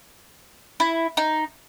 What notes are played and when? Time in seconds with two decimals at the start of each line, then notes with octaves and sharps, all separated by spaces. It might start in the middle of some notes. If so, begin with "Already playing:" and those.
0.80 E4
1.17 D#4